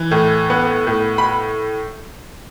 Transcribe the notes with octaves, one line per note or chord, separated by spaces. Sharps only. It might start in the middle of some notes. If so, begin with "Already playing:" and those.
Already playing: E3
A2
B3
A2
B5